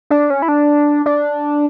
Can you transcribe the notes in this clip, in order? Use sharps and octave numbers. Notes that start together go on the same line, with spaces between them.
D4
C#4
E4
D4
D4